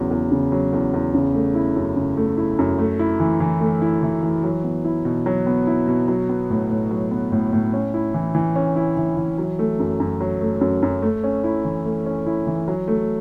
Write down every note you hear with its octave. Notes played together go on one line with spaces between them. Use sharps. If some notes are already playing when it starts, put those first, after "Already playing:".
Already playing: E2 C#3 F#3
E2
C#3
F#3
E2
E2
C#3
A3
E4
F#2
C#3
A3
E4
F#2
A3
E4
E3
E3
A3
E4
E3
E3
F#3
B3
E4
B2
F#3
B3
E4
B2
F#3
B3
A2
A2
F#3
B3
A2
A2
C#4
E4
E3
E3
C#4
E4
E3
E3
F#3
A3
F#2
F#2
F#3
A3
F#2
F#2
A3
C#4
E4
E3
A3
C#4
E4
E3
F#3
A3